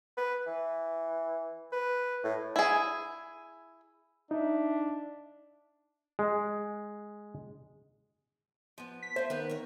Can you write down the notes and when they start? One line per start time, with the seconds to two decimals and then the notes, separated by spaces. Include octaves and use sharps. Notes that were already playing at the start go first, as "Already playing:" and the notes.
0.17 B4
0.47 E3
1.72 B4
2.24 A2
2.56 E4 G#4
4.31 D4 D#4 E5
6.19 G#3
8.78 F3 B3
9.02 B6
9.16 A3 F4 C5
9.30 D#3 B3 A#4 B4
9.49 A#4 C#5